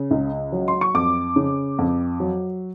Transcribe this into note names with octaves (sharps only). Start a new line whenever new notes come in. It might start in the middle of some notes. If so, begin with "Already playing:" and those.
Already playing: C#3
C#2
F#3
C6
C#6
F2 D6
C#3
F2
F#3